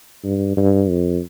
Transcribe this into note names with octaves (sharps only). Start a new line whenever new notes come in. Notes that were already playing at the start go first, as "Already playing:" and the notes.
G2
G2
F2